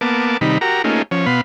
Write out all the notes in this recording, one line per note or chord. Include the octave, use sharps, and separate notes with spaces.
A#3 B3 A5 D6
C3 D#3 G3 D#4 B5
F#4 G4 A#4 A#5
A3 A#3 C#4 D#4 F4 G#4
F3 C#4 C#5
B2 B3 F5 B5 C6